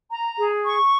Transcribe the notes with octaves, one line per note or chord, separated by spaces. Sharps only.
A#5
G#4
C#6